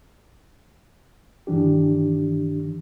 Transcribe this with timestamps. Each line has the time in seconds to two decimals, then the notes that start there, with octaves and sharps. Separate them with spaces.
1.47 G2 D#3 E3 D4 G4